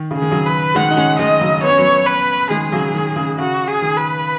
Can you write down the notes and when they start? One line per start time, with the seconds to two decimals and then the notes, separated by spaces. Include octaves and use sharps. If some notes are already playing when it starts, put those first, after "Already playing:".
Already playing: D#3
0.11 C#3
0.17 G#4
0.22 D#3
0.31 C#3 F#3
0.46 B4
0.75 D#3 G#3 F#5
0.91 D#4
0.97 G#3 C#4
1.19 D#3 G#3 D#5
1.41 C#3 F#3
1.63 B3 C#5
1.70 C#4
1.78 F#3 B3
2.06 B4
2.50 D#3 G#3 G#4
2.72 C#3 F#3
2.94 D#3
3.16 C#3
3.38 C#3 F#4
3.68 G#4
3.82 D#3
3.97 B4